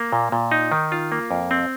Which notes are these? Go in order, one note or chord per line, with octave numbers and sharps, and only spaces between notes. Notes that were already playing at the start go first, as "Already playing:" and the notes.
Already playing: A#3
A#2
A#2
D#4
D#3
F4
A#3
F2
C4